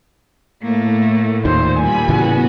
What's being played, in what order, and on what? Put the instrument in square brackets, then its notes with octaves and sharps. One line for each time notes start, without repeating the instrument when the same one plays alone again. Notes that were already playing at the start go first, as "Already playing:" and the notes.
[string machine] A2 [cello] A3 A#3
[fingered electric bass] D#2 D#3 [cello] A#2 [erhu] C5
[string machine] G3 B5 [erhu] G#5
[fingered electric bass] A2 C#3 E3 [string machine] B3 F#4